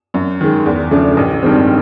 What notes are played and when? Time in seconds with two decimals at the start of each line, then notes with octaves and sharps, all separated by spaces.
0.14 F#2
0.41 D#3 G#3
0.66 E2
0.91 C#3 F3 A3 D4
1.17 A1
1.43 G2 D#3 G#3 C4